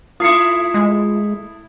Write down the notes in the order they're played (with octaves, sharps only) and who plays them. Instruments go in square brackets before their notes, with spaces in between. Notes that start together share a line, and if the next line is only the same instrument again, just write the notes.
[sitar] A3 E4 [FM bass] F4 [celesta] D#6 C7 C#7
[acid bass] G#3